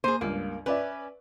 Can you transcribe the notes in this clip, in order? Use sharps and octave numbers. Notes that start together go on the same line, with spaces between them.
A#3 G#4 C5 D#7
C#2 G2 A#3
C#4 B4 D5 E5